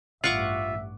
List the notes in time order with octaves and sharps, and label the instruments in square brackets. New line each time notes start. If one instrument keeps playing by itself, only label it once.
[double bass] A1 G2 [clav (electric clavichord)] F4 [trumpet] E5 [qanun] F#5 C#6 D6